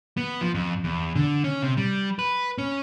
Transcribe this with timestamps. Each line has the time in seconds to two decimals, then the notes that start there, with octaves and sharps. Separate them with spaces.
0.17 B3
0.41 F3
0.54 F2
0.84 E2
1.15 D3
1.44 C#4
1.62 C3
1.77 G3
2.19 B4
2.58 C#4